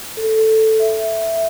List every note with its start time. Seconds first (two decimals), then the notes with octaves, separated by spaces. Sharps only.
0.17 A4
0.79 E5